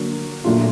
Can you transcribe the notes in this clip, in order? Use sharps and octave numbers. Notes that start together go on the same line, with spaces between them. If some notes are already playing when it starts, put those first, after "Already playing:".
Already playing: D3 F#3 A#3 D4 F#4
A#2 F#3 A3 D4 F4